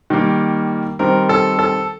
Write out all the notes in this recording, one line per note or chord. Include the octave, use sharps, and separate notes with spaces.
D#3 G3 A#3
D#3 G3 C4 A#4
A4
A4